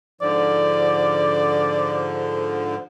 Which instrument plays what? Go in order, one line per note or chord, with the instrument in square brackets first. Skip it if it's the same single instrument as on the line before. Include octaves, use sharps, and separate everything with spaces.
[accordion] G#2 D3 F3 [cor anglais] D5